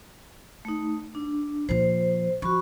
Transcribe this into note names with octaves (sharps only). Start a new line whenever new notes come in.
A3 D#4
D4
A#2 F3 C5
F3 F#4 B5 C#6